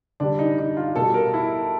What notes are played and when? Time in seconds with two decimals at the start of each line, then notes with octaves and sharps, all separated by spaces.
0.20 D3 G3 D4
0.39 D#4
0.58 D#4
0.77 F4
0.96 B2 G3 A4
1.14 A#4
1.34 E4